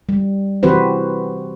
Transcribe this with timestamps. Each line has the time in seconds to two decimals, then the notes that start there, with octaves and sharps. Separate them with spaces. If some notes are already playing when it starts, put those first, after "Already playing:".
0.09 G3
0.63 E3 C4 F#4 G4 B4 C5